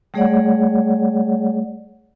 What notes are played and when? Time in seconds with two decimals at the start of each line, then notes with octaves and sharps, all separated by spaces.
0.14 G3 A3 G#4 C#5 D5 F#5